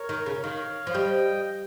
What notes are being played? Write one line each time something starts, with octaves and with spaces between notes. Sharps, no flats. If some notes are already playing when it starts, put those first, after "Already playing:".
Already playing: A#4 C#5
D#3
C#3
D#3 C#5 F5
F3
G3 D#5 G5